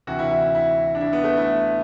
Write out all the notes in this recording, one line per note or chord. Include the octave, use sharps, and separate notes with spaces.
D2 C3 E3 F#4
E4
E4
E4
D4
E4
B3
A3
E4